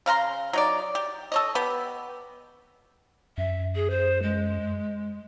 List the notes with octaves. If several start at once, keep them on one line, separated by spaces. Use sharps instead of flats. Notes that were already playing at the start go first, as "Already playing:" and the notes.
C#3 F5 A#5 C6
F#3 D#4 D5
G4
A4 C#5 D#5
B3 G4 B4
F#2 E5
G#4
C5
G#3